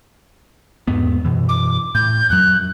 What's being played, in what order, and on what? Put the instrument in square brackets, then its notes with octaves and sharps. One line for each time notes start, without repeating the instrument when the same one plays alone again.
[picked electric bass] E2 G#2 B3
F#2 B2 E3
[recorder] D6
[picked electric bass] A2 [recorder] G6
[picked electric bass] F2 F#3 [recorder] F#6